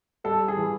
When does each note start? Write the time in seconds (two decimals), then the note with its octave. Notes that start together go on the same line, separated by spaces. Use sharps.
0.24 G3 A4
0.48 G#4
0.56 E3